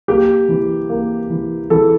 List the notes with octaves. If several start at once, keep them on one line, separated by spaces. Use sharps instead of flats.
A#3 G4
E3
A#3
E3
E3 A4